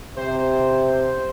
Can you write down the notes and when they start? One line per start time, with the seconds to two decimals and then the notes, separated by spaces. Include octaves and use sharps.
0.16 C3 C5